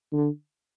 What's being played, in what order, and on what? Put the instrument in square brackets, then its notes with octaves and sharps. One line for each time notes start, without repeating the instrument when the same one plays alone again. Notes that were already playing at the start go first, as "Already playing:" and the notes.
[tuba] D3